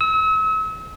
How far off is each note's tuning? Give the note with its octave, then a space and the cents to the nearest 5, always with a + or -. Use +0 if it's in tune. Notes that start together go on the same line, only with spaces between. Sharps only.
E6 -40